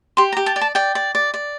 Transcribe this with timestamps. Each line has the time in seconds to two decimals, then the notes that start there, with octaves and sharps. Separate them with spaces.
0.17 G4 C6
0.32 A#5
0.37 G4
0.46 A5
0.56 D5
0.61 A5
0.75 D5 G5
0.95 D5
1.15 D5
1.34 D5